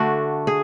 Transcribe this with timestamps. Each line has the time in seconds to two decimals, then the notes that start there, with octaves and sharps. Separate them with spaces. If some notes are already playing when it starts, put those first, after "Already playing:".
Already playing: D3 A3 D4 F#4
0.47 G#4